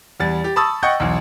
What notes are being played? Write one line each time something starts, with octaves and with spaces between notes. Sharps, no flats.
E2 G3 A6
G4
A5 B5 C#6 D#6 E6 A6
D#5 F#5 G5 C#6 G6 C#7
B1 E2